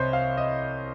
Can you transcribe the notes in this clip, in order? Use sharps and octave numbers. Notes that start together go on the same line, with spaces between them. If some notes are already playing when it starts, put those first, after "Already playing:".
Already playing: C2 C3 C5 C#5 D#5
F5
D#5